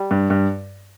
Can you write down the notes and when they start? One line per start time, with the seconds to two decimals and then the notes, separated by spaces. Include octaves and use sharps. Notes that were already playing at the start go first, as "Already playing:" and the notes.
Already playing: G3
0.11 G2
0.30 G2